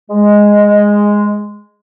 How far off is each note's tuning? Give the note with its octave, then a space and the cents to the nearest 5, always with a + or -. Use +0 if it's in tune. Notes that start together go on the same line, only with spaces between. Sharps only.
G#3 -5